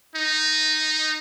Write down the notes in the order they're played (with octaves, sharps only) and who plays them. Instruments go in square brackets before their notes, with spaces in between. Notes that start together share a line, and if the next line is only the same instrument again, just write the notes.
[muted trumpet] D#4